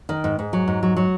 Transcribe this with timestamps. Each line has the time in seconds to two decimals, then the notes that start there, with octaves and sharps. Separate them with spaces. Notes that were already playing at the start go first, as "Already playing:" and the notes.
0.09 D#3
0.24 G#2
0.39 G#2
0.53 F#3
0.68 G#2
0.83 F#3
0.96 F#3